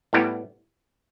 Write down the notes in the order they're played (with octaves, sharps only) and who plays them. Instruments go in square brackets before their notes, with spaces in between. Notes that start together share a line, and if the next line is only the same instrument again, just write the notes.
[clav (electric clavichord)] A2 G3 B3 E4